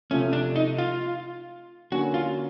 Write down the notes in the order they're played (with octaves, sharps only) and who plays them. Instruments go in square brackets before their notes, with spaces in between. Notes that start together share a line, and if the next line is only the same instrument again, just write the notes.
[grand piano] C3 F3 A3 [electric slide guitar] C#4
[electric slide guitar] D4
D#4
F4
[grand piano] D3 F#3 A#3 C#4 [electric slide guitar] F#4
[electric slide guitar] F4